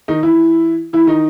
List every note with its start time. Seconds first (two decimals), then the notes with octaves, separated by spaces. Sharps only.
0.08 D#3 D#4
0.23 E3 E4
0.93 E3 E4
1.07 D#3 D#4